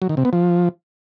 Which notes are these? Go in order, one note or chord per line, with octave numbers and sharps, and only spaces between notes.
F#3
D#3
C3
B3
F3